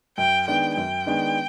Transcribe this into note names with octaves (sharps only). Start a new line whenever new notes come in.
F#2 G5
D#3 G#3 B3 D4 G5
F#2 G5
D#3 G#3 B3 D4